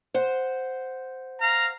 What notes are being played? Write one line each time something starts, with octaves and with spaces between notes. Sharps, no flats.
C5 F#5
F5 A#5